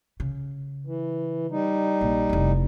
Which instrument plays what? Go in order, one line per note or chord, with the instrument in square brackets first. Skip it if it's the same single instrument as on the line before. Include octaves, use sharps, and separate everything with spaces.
[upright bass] C#3
[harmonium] E3
G3 D#4
[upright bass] A#1
F1 E4